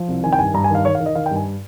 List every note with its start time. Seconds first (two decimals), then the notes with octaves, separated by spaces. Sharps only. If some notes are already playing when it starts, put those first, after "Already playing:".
Already playing: F3
0.08 C2
0.23 D#3 G#5
0.33 G5
0.39 G2 G#5
0.54 G2 A#5
0.64 G#5
0.70 D#3 F5
0.85 D#3 C#5
0.95 F5
1.00 D#3
1.06 D#5
1.15 D#3 F5
1.26 G5
1.31 G2
1.36 G#5